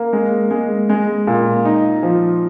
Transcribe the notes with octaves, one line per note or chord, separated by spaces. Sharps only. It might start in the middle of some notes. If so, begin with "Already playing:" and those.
Already playing: A#3
G#3
G#3
G#3
A#2
D#4
F3